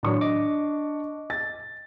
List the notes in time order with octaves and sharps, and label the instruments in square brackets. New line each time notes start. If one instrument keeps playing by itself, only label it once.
[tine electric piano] A2 D#3 F#3 [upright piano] D4 C#6
[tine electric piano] D#5 D6
[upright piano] A6